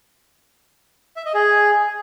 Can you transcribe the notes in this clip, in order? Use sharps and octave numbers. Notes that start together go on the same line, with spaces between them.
E5
D#5
G#4